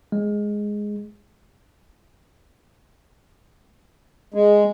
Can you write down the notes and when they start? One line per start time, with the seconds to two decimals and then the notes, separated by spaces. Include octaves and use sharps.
0.12 G#3
4.34 G#3